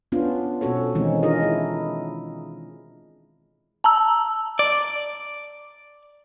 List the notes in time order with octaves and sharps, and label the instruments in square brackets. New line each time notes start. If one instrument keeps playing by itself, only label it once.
[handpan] B3 C#4 D4 F4
B2 C4 C#4 F#4 A4 C#5
D#3 E3 G#3 C4 C#4 D#4
D4 D#4 F4 G#4 A#4 D#5
E4
[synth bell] A5 A#5 E6
[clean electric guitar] D5